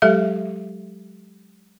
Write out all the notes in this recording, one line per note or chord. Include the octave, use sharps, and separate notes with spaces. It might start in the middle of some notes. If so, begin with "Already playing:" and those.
F#3 G#3 G4 A4 E5